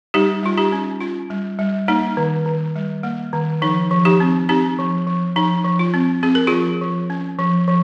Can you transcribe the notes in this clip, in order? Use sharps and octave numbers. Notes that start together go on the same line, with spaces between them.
G3 D#4 G4
G3 F4
D#4 G4
C#4
C#4 F4
G3
G3
A#3 D#4
D#3
D#3
G3
A#3
D#3
F3 D#4
F3
D#4 G4
C4
C4 D#4 G4
F3
F3
F3 D#4
F3
F4
C4
C4 G#4
A#4
F3 F4 G#4
F3
C#4
F3
F3